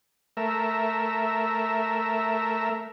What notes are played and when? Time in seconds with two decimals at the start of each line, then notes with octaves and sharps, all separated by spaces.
0.37 A3 A#4 E5